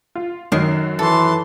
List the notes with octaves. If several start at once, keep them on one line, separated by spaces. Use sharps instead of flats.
F4
F#2 D#3 F#3 C7
E3 A4 A5 C6